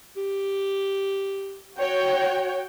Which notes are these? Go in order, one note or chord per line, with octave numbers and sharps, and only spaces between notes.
G4
F#4 C#5 G5